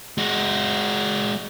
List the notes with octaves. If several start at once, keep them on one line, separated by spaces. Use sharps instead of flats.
G#3 F#4